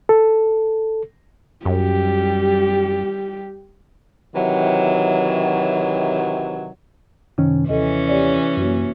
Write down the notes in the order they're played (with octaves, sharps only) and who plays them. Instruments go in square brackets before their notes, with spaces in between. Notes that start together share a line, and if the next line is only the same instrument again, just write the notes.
[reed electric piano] A4
[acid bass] F#2 [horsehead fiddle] G3 G4
[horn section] C3 D#3 E3 F#3
[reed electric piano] F#2 D#3 C#4 [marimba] C3
[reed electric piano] D#2 [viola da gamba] E3 C#4 [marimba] A4 D#5
[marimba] G4 C#5 D5
[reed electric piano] F#2 [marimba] A#3 F#4